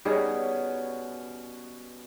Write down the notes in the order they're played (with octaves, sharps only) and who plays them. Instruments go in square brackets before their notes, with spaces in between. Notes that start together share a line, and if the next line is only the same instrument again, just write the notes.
[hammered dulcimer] B2 C#4 C#5 [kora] G3 D#4 G#4